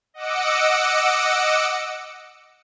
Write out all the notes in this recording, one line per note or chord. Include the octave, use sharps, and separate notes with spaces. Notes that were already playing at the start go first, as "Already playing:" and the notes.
D#5 F#5 D6 E6 C#7